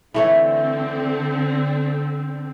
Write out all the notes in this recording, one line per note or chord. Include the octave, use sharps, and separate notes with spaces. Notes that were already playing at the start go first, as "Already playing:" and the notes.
D3 E3 A3 C4 C#5